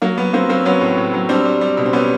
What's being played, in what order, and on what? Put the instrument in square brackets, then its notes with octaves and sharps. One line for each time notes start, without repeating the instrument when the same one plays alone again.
[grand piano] F#3 A#3
F#3 B3
F#3 A#3 C4
F#3 A#3 C4
F#3 B3 C#4
A2
A2
F#3
G3 C4 D4
G3
G3
B2
C4
G3 B3 C#4